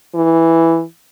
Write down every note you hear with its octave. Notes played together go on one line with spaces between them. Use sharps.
E3